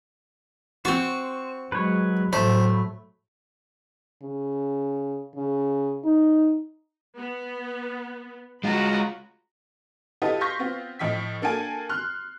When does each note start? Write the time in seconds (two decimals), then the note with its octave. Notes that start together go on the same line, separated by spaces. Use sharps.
0.85 C4 F#4 C5 C#6
1.72 F#3 G#3 B4 C#5
2.33 A2 F#3 A3 C5 B5
4.22 C#3
5.36 C#3
6.04 D#4
7.18 B3
8.64 G#3 F4 F#4 A#5 B5
10.22 E4 F4 G4 A4 B4 D#5
10.41 F5 C6 C#6 G6 A#6 B6
10.59 B3 C4 F4
10.99 A2 F3 D#5 E5 G5 B6
11.42 A#3 D4 A4 F5 G5 G#5
11.89 C6 F6 F#6